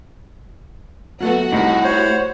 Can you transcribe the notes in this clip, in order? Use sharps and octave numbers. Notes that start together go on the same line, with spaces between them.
F#3 A3 B3 F#4 F#5
C2 A2 D#4
C5 C#5